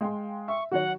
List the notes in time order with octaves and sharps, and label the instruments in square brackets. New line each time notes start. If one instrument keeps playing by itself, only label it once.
[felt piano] G#3 [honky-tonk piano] F5 G5 C6
[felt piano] E5 [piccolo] C#6
[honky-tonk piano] D#3 F#3 C#5 [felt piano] F#4 [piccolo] F#5